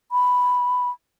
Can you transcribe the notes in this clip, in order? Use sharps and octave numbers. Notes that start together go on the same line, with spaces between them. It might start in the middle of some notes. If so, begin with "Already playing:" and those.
B5